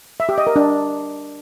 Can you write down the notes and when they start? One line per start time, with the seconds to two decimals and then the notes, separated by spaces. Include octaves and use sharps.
0.20 E5
0.29 G4
0.38 D#5
0.47 A#4
0.56 D4